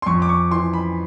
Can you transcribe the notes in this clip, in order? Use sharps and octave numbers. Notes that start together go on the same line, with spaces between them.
C6
F2 C#6
D6
C#6
E3 C6
B5